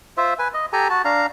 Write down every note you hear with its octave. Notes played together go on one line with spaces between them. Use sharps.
F4 C5 E5
B4 G#5
D#5
G4 A4 G#5 A#5
F#4 A5
D4 F5 A#5